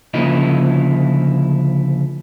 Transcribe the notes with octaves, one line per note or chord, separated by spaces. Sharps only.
D2 C#3 F3 A#3 E4 D#5